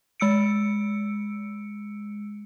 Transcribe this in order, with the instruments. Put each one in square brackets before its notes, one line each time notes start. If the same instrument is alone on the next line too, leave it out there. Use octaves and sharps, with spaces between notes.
[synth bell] G#3 E6 C#7 D7